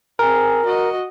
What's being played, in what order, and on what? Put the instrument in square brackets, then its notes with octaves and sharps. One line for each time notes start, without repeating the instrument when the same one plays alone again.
[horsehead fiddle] C4 G#4 [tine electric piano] A#4
[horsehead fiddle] F#4 D#5